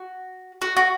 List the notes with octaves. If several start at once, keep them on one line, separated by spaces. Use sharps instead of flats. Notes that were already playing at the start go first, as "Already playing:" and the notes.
Already playing: F#4
F#4
F#4